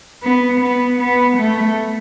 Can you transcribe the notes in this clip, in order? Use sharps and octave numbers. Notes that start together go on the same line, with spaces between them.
B3
B3
B3
A3